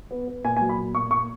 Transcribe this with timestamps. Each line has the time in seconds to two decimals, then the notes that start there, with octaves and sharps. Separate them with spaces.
0.11 B3
0.28 B3
0.44 A#2 G#5
0.57 G#5
0.61 F#3
0.69 B5
0.78 A#2
0.94 A#2 C#6
1.11 A#2 C#6